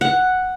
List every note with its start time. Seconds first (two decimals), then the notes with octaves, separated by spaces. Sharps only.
0.01 F#5